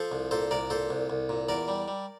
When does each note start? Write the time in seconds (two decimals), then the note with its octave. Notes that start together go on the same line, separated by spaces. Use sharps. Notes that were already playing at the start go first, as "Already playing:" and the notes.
Already playing: F3 A4 C5
0.12 C2
0.31 A#2 A4 C5
0.51 C2 A#4 D5
0.70 A#2 A4 C5
0.90 C2
1.10 C2
1.29 A#2
1.49 E2 A#4 D5
1.68 G3
1.88 G3